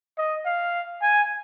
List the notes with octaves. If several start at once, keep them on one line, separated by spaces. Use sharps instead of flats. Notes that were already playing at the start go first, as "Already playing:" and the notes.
D#5
F5
G#5